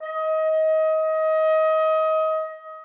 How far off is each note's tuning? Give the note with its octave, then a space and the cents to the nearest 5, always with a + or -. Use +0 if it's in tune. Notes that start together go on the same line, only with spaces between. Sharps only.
D#5 +25